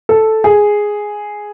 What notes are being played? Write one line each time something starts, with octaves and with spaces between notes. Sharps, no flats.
A4
G#4